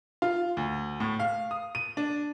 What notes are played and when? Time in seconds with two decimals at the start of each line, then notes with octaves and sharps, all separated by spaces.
0.22 F4
0.57 D2
1.00 A2
1.20 F5
1.51 D#6
1.75 D#7
1.97 D4